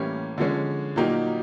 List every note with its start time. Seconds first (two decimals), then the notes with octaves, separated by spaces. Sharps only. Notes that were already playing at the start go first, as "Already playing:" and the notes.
Already playing: A2 E3 G3 A#3 C#4
0.38 D3 F3 G#3 C#4
0.96 A#2 F#3 A#3 D#4 G4